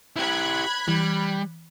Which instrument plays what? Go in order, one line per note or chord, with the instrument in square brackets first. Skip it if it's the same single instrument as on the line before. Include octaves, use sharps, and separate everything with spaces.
[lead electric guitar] E4 G4 [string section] B5 F#6 G#6
[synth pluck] E3 [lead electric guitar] G3